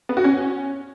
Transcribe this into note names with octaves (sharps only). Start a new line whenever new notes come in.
B3
F#4
C#4